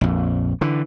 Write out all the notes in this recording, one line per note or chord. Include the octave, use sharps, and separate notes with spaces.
A#1 F2
D3 E3